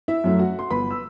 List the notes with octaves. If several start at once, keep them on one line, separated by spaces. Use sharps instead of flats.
E4 E5
F#2 F#3 A3
F#4 F#5
C6
G1 B4 B5
E6